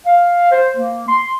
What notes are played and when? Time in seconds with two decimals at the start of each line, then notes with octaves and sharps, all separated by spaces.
0.06 F5
0.51 C5
0.76 A#3
1.07 C6